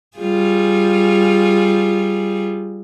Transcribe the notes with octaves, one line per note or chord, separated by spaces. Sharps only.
G3 F4 G#4